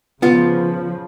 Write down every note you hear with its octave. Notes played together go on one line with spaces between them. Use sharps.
C#3 F3 B3 F4